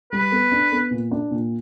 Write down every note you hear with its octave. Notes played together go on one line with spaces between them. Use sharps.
G3 B4
B3
D4
B3
A#2
D4
A#2